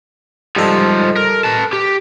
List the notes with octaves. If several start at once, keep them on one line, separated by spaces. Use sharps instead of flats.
G#2 F3 G3 A4 D#5
A#4
B4 A5
G4